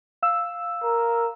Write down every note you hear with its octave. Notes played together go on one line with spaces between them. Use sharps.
F5 E6
A#4